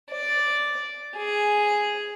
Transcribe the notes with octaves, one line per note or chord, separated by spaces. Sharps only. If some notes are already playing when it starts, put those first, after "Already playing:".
D5
G#4